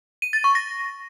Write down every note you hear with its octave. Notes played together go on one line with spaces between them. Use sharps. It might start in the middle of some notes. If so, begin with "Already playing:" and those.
D#7
A6
C#6
A#6